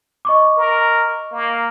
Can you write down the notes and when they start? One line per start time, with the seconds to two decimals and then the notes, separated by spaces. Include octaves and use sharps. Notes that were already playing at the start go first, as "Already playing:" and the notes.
0.25 D#5 C#6 D6
0.57 A#4
1.32 A#3